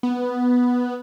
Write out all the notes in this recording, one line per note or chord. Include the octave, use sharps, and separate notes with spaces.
B3